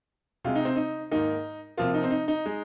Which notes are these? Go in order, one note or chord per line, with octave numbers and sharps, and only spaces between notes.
C3 G#3 F4
D#4
C4
D#4
G#2 D#3 A#3 D#4
C3 F3 A#3 F4
D#4
C4
D#4
D#4
G#3